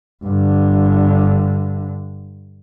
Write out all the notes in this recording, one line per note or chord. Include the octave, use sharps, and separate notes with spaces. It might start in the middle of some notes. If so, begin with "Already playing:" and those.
G2 D3